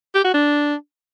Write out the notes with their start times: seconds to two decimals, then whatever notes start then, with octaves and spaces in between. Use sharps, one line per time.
0.15 G4
0.24 F#4
0.34 D4